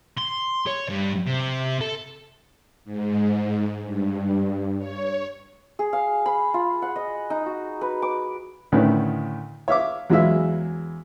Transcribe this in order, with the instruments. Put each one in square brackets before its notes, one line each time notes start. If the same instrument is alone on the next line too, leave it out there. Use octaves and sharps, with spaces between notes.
[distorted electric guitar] C6
C#5
G2
C3
A4
[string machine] G#2
G2
C#5
[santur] G#4
F5
B5
F4
F#5
D#5
D#4
F#4
B4
D6
[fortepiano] D2 A2 D#3 C#4 B4
C#5 E5 F5 D6
E2 F#3 G#3 E4 E5 F5